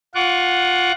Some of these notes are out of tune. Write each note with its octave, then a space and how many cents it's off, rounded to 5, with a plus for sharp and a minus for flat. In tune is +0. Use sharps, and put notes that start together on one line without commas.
F4 +15 F#5 +0 C#6 +40